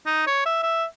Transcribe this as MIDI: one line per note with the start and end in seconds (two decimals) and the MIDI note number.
0.06 0.23 63
0.27 0.41 73
0.46 0.59 76
0.63 0.85 76